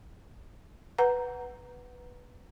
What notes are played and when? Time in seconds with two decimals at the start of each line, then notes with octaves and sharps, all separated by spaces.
0.98 B4 F#5 A#5